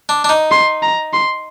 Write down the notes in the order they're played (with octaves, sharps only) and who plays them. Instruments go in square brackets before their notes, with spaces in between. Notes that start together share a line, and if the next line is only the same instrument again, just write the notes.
[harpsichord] D4
D4
D#4
[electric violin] C6
A#5
C6